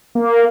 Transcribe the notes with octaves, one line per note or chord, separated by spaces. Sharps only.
A#3